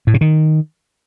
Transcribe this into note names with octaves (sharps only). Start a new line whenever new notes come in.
A2
C3
D#3